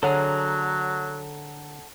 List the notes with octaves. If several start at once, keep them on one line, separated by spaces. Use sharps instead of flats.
D3 F#3 G#4 A4 C#5 F#5 A#5